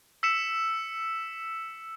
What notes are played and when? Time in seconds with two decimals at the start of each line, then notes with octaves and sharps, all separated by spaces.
0.23 E6 B6 C#7 E7